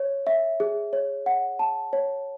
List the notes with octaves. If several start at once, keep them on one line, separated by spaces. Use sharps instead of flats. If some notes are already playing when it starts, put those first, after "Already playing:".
Already playing: C#5
E5
G#4
C#5
F#5
A5
C#5